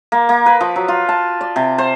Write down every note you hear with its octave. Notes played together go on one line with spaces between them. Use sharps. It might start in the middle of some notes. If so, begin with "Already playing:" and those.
A#3
A#3
B4
F3
F#3
F4
A5
D5
C3
C5